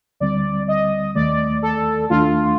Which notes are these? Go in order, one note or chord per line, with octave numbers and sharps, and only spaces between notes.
D2 D3 G3 C4 D5
D#5
D#2 D#3 A3 D5
A4
D#2 D#3 A3 D4 F4